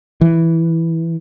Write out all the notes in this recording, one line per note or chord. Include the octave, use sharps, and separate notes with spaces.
E3